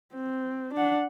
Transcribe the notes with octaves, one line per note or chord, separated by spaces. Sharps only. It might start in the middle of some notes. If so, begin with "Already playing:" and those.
C4
D4 F#5